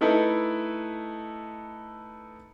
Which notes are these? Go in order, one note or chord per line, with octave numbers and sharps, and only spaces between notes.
A3 D#4 E4 A4 B4